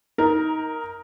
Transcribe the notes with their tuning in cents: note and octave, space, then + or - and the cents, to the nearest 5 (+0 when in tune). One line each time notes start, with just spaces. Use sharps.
D#4 +20 A#4 +0